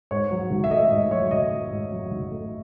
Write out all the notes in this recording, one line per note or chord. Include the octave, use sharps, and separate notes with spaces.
G#2 C#5
F#3
G#1
E5
A3 D#5
G#2 D#5
F#3 C#5
G#1 D#5
A3
G#2
F#3
G#1
A3